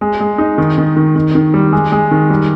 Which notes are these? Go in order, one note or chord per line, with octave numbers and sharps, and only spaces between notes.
G#3
G#3
D#4
D#3
D#3
D#3
D#3
D#3
G3
G#3
G#3
D#3
G3